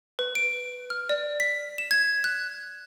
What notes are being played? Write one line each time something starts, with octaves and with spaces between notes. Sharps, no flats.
B4
D7
F6
D5
B6
E7
G#6
F#6